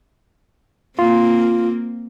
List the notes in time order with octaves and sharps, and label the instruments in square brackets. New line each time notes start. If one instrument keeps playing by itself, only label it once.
[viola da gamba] A#3 C4 [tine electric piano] F4